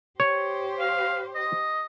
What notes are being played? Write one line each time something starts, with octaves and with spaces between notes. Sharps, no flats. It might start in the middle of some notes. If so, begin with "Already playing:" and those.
G4 C5 C#5
F5
D#5